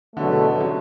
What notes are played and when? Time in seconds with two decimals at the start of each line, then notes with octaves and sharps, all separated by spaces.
0.16 E2 B2 D3 F#3 A3
0.61 D3 F#3